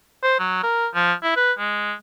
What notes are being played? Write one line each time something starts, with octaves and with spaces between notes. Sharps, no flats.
C5
F#3
A#4
F3
E4
B4
G#3